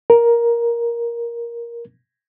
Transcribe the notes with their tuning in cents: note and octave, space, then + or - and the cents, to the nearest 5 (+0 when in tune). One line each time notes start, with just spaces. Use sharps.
A#4 +10